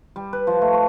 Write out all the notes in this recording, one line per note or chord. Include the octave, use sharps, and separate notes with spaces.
G3
B4
F3
A3
C#6